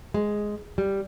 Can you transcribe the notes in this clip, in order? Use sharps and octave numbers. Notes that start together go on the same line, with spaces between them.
G#3
G3